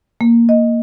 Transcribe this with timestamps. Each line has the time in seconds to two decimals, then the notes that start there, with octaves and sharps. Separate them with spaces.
0.21 A#3
0.49 D#5